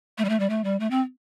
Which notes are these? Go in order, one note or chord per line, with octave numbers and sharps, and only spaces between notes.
A3
G3
A3
G3
A3
G3
A3
C4